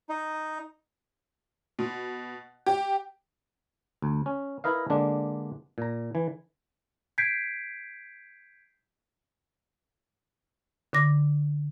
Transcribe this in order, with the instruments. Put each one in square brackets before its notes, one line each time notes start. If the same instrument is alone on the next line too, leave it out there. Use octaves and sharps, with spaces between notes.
[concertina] D#4
[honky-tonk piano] B2
G4
[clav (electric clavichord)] D2
C#4
E4 A#4 B4 D#5 F5
D3 G#3 A#3 D4
A#2 A#5
E3
[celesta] G6 G#6 B6 C7 D7
[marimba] D3 D6 A#6